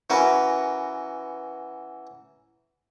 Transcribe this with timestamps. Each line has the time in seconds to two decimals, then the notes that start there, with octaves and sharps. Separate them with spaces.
0.10 E3 C#4 F#4 A#4 B4